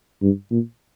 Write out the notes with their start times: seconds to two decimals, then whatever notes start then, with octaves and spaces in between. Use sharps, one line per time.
0.22 G2
0.51 A#2